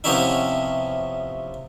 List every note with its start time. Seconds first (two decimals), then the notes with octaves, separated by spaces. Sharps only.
0.04 C3 F3 B3 C#4 D#4 E4